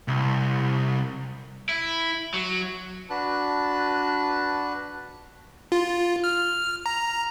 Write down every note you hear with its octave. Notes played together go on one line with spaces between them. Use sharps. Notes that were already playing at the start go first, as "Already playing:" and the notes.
C2
E4
F#3
D4 F#4 B4 A5 F#6
F4
F6
A#5